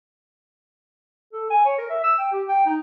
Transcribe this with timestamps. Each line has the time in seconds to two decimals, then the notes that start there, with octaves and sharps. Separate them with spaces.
1.33 A4
1.50 G#5
1.65 C#5
1.78 A#4
1.90 E5
2.04 E6
2.18 G5
2.32 G4
2.49 G5
2.66 D#4